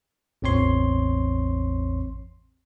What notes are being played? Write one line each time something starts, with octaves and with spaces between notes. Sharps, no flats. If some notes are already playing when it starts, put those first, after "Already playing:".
A1 E2 C4 C#5 C6